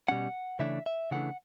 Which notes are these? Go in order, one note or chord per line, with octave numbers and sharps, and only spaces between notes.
B2 G3 C#4 F#5
C#3 E3 A3 D4 E5
E5
C#3 E3 A3 D4 F#5